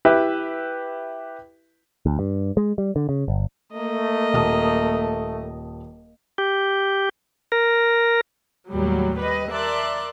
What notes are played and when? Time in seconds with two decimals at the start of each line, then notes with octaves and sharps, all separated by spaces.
0.05 E4 G4 B4 E5
2.06 D2
2.19 G2
2.57 G#3
2.78 G3
2.96 D3
3.09 C#3
3.28 G1
3.73 A3 A#3 D#5
4.34 D#1 A5 D#6
6.38 G4
7.52 A#4
8.72 D#2 A2 F#3 G3
9.19 G3 B4 D#5
9.52 A#4 D5 E5 A5 C6 F#6